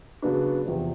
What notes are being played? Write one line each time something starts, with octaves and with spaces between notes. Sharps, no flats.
C#3 F#3 B3 D4
E2 C3 F3